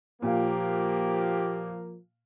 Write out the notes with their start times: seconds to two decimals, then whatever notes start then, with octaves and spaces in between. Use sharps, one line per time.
0.22 A#2 F3 A#3 G4 F5